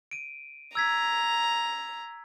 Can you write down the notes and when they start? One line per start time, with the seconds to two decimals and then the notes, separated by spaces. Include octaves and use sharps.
0.11 D7 D#7
0.75 A#5 E6 G#6 B6